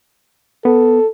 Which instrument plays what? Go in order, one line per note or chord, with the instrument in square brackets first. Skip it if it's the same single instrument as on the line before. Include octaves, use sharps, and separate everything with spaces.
[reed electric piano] B3 [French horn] A4